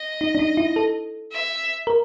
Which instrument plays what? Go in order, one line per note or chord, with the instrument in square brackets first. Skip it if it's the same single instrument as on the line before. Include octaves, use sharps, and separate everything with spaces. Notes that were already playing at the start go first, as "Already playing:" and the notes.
Already playing: [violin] D#5
[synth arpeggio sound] D#4
D4
D#4
E4
A4
[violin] E5
[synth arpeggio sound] A#4